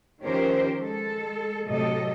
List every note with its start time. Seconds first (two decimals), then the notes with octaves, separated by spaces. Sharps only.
0.21 D#3 F3 C#4 G4 A#4 C5
0.79 G#3 A4
1.67 A2 C3 F#3 A4 D#5